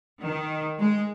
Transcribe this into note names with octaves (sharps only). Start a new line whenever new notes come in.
D#3
G#3